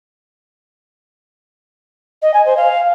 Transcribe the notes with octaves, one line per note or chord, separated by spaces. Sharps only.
D#5
G#5
C5
F5